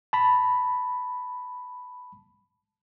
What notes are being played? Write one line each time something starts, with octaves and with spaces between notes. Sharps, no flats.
A5 B5